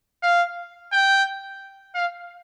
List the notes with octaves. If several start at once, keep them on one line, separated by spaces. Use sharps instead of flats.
F5
G5
F5